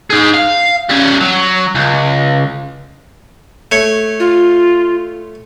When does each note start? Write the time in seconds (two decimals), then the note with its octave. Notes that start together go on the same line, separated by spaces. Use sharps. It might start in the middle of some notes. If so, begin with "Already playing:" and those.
0.10 D#4 G#4
0.34 F5
0.89 G3 C#4
1.21 F#3
1.75 C#2
3.72 A3 C#5
4.20 F4